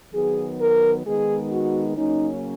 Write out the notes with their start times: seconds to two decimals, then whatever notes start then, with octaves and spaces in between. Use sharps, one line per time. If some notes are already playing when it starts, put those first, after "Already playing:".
0.14 D#3 F#3 B3 G#4
0.60 A#4
1.05 D#3 G#3 B3 D#4 G#4
1.51 F#4
1.96 C#3 F#3 A#3 C#4 D#4